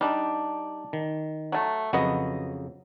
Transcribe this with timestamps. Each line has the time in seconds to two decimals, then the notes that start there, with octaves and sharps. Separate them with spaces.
0.01 G3 D4 D#4 G4
0.93 D#3
1.52 F#3 A3
1.93 F2 C#3 F#3 F#4 B4 D#5